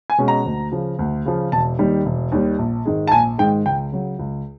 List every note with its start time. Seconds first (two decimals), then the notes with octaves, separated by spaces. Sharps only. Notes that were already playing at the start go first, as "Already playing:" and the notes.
0.10 G#5
0.18 B2 G#3 C#4
0.28 A#5
0.45 D2
0.72 C#3 F3
0.99 D2
1.26 C#3 F3
1.52 E1 A5
1.79 D#2 D#3 G3
2.06 E1
2.32 D#2 D#3 G3
2.59 A#1
2.85 G#2 D#3 G#3
3.08 A5
3.12 A#1 G#5
3.38 G#2 D#3 G#3 G5
3.66 C#2 G5
3.92 C#3 F#3
4.19 C#2